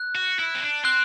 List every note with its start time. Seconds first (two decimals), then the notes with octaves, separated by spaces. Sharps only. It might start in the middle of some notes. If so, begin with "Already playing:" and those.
Already playing: F#6
0.15 F#4
0.39 E4
0.55 C4
0.61 D4
0.85 C4 F#6